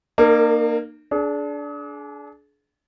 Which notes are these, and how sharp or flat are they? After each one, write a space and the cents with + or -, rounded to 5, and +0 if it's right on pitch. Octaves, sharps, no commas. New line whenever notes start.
A#3 +0 D#4 -45 A#4 -35
D4 -15 G#4 +35